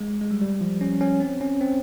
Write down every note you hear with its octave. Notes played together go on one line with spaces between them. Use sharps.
G#3
G#3
G3
G3
F3
C#4
C#4
C4
C#4
C4